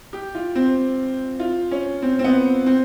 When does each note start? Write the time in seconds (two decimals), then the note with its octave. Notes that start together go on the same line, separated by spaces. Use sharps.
0.13 G4
0.35 F4
0.55 C4
1.40 F4
1.71 C#4
2.02 C4
2.19 C4
2.24 B3
2.66 C4